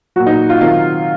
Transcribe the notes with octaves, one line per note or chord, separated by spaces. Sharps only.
A#2 F#3 F#4
D#4
F4
C3 D#3 F#3 F4